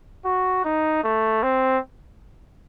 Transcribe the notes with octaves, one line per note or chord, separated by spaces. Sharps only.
F#4
D#4
A3
C4